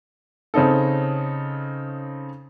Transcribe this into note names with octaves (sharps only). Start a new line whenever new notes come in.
C#3 C4 C#4 D#4 A4